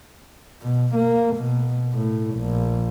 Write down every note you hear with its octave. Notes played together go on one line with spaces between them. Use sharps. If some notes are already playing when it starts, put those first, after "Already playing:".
B2
A#3
B2
A2
A#1